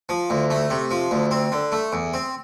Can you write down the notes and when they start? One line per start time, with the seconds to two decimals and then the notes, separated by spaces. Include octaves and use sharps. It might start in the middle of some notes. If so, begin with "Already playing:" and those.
0.09 F3
0.30 D2
0.50 A3
0.70 C3
0.91 F3
1.11 D2
1.31 C4
1.52 D3
1.72 A3
1.93 E2
2.14 C4